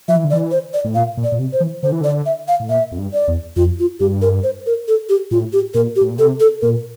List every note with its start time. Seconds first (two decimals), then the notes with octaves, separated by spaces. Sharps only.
0.08 F3 E5
0.17 E3
0.24 D3
0.31 E3 D5
0.51 C5
0.74 D5
0.84 A2
0.95 A#2 F5
1.17 A#2
1.24 D5
1.32 A#2
1.39 C3
1.53 C5
1.60 E3
1.83 D3 C5
1.92 E3
2.01 D3 D5
2.26 E5
2.48 F5
2.60 A2
2.69 A#2 E5
2.92 F2
2.98 G2
3.14 D5
3.28 E2
3.56 F2 F4
3.79 F4
4.00 G2 G4
4.22 A#4
4.43 C5
4.66 A#4
4.88 A4
5.09 G4
5.31 A2 F4
5.53 G4
5.74 A#2 A#4
5.96 G4
6.01 A2
6.10 A#2
6.18 C3 A4
6.40 A4
6.61 A#2 A#4